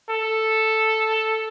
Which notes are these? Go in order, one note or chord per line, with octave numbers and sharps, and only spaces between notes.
A4